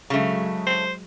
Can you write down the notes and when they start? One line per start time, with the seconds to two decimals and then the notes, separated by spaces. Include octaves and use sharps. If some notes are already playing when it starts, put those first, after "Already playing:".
0.10 C#3 F#3 G#3 A3
0.66 C5